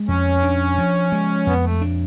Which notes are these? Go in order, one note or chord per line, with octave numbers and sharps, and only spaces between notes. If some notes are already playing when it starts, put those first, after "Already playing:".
Already playing: G#3
F2 C#4
D4
F3
G#3
F2 B3
A3
D4